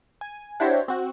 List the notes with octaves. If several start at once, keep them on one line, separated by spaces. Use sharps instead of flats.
G#5
D4 E4 F#4 G4 C5 C#5
C4 F#4